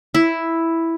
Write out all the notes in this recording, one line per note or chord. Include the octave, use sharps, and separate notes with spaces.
E4